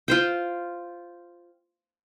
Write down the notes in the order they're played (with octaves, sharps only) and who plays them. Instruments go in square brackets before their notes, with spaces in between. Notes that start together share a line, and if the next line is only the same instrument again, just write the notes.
[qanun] F4 C5 G5